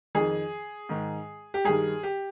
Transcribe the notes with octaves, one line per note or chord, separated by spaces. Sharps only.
F2 D#3 G#4
G#2 D#3
G4
G2 D#3 G#4
G4